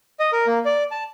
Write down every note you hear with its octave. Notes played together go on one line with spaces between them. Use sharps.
D#5
A#4
A#3
D5
A5